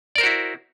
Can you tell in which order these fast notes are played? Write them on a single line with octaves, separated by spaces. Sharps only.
D5 A#4 C5 F#4 E4